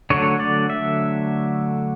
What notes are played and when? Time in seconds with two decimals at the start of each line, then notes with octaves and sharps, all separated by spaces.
0.10 D3 F#3 A3 C#5
0.40 D5
0.70 E5